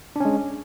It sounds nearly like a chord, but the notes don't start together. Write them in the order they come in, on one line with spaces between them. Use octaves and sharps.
D4 C#4 G#3